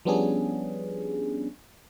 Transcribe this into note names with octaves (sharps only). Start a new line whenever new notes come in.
F3 G3 B3 C#4 D4 G#4